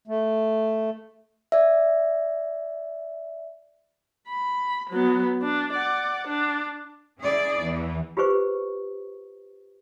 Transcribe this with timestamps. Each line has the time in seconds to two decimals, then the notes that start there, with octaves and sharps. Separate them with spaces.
0.08 A3
1.52 D5 E5
4.28 B5
4.90 F#3 B3
5.42 D4
5.73 D5 F#5
6.28 D4
7.21 C#4 E4 G#4 D5
7.61 E2 E3
8.17 F4 G4 G#4 B4 C5 C#6